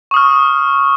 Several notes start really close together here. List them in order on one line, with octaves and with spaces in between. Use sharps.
C#6 D#6 F6